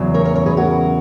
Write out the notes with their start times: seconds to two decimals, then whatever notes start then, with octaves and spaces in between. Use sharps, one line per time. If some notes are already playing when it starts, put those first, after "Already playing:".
Already playing: E2 C#3 F#3
0.14 A#4 C#5
0.25 A#4 C#5
0.35 A#4 C#5
0.46 G#4 B4
0.57 F#4 A#4